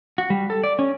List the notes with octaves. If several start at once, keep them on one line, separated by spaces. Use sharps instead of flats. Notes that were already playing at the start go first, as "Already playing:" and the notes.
F#4
G3
A4
D5
C#4